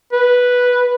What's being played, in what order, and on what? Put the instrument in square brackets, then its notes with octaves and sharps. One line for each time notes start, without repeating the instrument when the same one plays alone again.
[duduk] B4